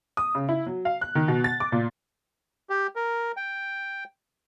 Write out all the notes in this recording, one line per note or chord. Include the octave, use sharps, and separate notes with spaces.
D#6
C#3
E4
F#3
F5
F#6
D#3
B2
A6
D6
A#2
G4
A#4
G5